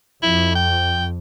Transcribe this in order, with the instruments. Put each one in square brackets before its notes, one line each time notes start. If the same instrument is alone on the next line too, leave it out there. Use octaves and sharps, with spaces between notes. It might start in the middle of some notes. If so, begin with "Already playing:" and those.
[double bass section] F2 [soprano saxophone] E4
[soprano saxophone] G5